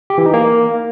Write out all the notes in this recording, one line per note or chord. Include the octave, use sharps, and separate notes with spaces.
G4
E3
D#4
A#3